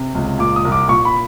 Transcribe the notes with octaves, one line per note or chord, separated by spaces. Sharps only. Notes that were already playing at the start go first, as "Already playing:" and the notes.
Already playing: C3
C#2
A#2 D6
D#6
C2
D6
A#2 C#6
B5